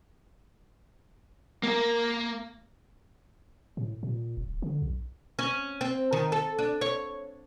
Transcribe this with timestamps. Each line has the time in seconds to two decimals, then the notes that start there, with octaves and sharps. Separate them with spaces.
1.63 A#3 A#4
3.77 A2
4.03 A#2
4.37 D1
4.62 D3
4.82 B1
5.39 C#4
5.81 C4
6.13 D#3
6.32 A4
6.59 D4
6.81 C#5